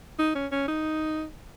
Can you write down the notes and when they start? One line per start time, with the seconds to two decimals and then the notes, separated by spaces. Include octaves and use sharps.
0.19 D#4
0.35 C#4
0.52 C#4
0.68 D#4